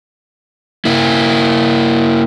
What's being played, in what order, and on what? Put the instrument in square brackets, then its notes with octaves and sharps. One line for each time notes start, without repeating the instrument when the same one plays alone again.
[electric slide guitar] A#3 E4